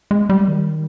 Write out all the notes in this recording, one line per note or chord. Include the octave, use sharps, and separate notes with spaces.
G#3
G3
D#3